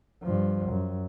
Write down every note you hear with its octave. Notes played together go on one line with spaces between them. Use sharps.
G2 F3
F#2